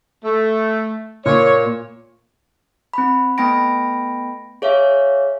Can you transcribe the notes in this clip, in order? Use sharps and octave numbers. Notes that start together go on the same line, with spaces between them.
A3
A#2 C#5
C4 B5
A3 B3 G5 B5 A#6 D7
G#4 C#5 E5 F5